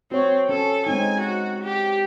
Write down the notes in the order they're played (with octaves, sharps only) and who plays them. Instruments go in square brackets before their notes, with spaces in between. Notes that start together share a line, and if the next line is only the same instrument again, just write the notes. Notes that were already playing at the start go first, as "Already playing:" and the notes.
[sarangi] C4 [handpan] F#4 C#5
[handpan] C#4 [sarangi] A4
[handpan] G#3 C4 D#4 [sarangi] G#5
[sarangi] F#4
G4